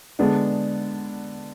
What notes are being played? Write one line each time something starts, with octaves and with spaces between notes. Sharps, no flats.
D3 G#3 B3 D4